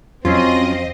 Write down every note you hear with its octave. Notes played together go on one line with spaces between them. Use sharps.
F2 F#3 C4 C#4 F4 D#5 C7